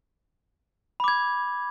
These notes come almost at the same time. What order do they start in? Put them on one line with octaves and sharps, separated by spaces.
B5 D6 G#6